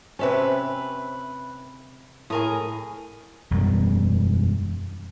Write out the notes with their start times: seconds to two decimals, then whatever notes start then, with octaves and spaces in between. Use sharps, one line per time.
0.19 C3 C4 C#4 B4 E5 A5
2.30 A2 G#4 A#4 D#6
3.51 E1 F#2 G3